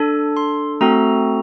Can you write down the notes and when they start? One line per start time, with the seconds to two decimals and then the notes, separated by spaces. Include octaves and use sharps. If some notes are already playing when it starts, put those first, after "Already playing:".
Already playing: D4 A4
0.37 C6
0.81 A3 C4 F#4 A4 A#5